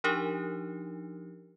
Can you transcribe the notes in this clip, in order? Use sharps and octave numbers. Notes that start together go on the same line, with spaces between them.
F3 D4 D#4 G4 A#4